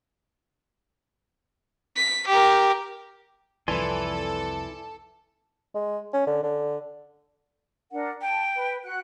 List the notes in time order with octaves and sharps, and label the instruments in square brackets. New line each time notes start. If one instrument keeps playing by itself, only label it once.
[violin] B6
G4 A#4
[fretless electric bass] C2 F2 [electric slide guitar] E4 B4 [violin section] A4 [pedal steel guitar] D5 G#5 C6
[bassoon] G#3
C#4
D3
D3
[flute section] D4 A#4 F#5
[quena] G5 [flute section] A5
[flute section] B4
F#4 F#5 F#6